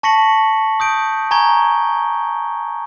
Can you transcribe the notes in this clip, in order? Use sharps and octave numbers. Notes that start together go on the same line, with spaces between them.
A5 C#6 A#6 B6 C#7 F#7
D#6 G6 D7
G#5 A#5 C#6 G#6 G7